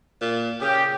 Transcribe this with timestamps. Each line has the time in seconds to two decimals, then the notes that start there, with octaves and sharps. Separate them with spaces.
0.21 A#2
0.61 C#3 G4